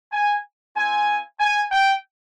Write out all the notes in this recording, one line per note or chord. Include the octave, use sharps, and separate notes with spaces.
G#5
C4 F4 G#5
G#5
G5